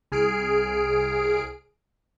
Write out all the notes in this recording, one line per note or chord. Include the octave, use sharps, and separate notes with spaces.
C2 G#4 F6 C7 D7